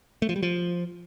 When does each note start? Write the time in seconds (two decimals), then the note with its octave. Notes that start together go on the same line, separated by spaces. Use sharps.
0.22 A3
0.29 F3
0.36 G3
0.43 F3